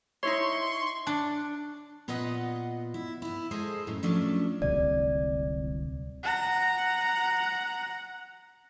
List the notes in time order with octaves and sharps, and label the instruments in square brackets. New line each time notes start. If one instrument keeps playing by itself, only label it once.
[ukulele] D#4 E4 C#5 [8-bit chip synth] C6 [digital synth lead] C#6
[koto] D4
[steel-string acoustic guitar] A#2 B3 F4 B4 D#5 F#5
E4
B3 E4
G#3 G#4 A4 C5 D#5
F#2 A2
F3 F#3 A3 C#4 D4
[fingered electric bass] D1 C2 C3 [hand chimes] D5
[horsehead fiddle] F#5 A#5